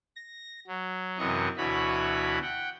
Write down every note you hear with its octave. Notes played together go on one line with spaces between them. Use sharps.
A#6
F#3
F#2 C3 E3 D#5 C#6
D2 B2 E3 F#4 C#5 B5
F#5 G5